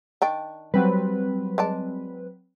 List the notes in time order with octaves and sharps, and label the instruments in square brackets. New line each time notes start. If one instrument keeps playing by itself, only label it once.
[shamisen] D#3 D4 G5
[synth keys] F#3 C4 B4 [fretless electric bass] G3
[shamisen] G#3 D5 A5